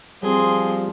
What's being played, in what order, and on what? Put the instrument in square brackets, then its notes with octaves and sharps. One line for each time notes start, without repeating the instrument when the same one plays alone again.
[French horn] F3 [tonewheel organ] G3 [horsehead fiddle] C4 [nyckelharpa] G#4 C6